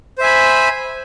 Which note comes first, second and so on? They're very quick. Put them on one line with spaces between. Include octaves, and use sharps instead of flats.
C5 E5 G#5 B5